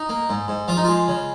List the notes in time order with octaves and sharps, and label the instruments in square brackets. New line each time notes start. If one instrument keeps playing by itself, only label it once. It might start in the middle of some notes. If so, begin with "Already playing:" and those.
Already playing: [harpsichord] D#4
A#3
G#2
G#2
F3 F4
D#4
G#3 F4
C#3